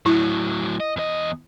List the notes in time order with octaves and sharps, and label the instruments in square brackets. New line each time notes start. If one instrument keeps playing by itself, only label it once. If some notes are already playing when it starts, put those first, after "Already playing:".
[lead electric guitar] A2 F#3 [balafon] E4
[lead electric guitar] D#5
E2 D#5